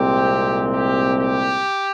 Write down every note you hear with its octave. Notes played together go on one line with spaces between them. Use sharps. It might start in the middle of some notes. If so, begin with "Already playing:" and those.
Already playing: C2 A#2 G#3 C4 G4
G4
G4